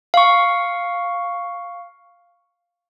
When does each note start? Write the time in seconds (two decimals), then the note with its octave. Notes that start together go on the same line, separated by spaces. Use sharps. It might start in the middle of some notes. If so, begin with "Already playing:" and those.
0.14 F5 C#6